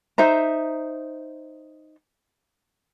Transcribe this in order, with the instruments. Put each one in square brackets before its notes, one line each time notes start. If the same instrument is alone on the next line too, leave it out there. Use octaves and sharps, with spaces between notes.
[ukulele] D#4 C5 E5 A#5